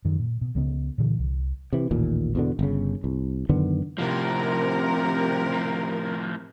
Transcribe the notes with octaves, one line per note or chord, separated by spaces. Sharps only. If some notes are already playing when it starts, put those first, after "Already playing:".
F#2 D#3
A#2
B2
C#2 C#3 B3
A#2 D3 E3
C2
C3 E3
A1 D#2 A#2
E2 B2 D3
G1 C#3
C2
F#2 D3 D#3 B3
A2 C3 F3 A#4